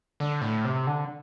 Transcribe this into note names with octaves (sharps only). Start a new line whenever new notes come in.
D3
A2
C3
D3